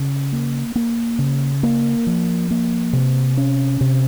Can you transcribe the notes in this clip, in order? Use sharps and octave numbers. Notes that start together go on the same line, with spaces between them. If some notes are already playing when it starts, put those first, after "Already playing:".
Already playing: C#3
A#3
A#3
C#3
A#3
F3
A#3
C3
C#4
C3